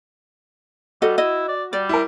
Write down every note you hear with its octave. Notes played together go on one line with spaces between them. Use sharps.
G3 F#4 A4 D#5
E4 D#5
D5
G3 D5
E4 A#4